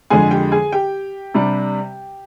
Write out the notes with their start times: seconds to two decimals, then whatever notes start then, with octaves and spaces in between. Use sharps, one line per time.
0.10 F2 D3 G#3 G#4 G#5
0.31 G4 G5
0.52 G#4 G#5
0.72 G4 G5
1.34 C3 G3 D4